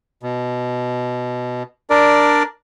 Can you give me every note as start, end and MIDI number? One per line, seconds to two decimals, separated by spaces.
0.23 1.63 47
1.90 2.43 62
1.90 2.43 70
1.90 2.43 74